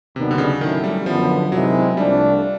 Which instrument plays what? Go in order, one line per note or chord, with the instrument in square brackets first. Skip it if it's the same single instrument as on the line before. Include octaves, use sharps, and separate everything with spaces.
[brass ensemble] D#2 D#3 F#3 B3 D4 [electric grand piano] C3
[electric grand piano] D3
C#3
[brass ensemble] A2 F#3 A3 C#4 E4 [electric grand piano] D#3
[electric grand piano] G3
[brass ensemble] F#2 D3 F#3 B3 [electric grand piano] F3
[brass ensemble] C3 D#3 G#3 C4 E4 [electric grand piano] F#3
[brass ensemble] C2 C3 F3 A3 D4 [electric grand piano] G3